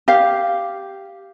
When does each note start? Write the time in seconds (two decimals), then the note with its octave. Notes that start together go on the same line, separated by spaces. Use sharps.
0.08 G4 F5